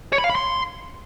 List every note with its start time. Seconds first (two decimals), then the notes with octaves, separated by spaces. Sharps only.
0.13 C#5
0.18 B5
0.24 F5
0.30 B5
0.35 C6